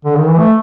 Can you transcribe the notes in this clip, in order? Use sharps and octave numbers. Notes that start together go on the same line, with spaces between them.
D3
D#3
E3
A3